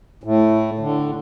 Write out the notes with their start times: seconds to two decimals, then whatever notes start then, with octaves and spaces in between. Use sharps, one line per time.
0.24 A2
0.80 D3